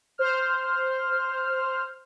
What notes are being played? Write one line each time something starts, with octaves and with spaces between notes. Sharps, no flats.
C5 F6